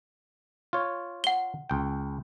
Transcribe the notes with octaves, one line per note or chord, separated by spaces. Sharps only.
F4 C#5
F#5 G7
C#2 G5